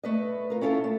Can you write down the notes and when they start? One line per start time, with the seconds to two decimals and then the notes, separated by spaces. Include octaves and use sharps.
0.03 A3 B4 D#5
0.50 F4 A#4
0.61 C#4 E4 F4 A4
0.84 A3